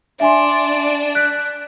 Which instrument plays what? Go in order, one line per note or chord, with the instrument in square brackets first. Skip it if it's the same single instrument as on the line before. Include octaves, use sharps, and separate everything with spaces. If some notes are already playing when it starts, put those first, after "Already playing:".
[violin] D4 [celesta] E5 G#5 C6
[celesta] F#6 B6 D7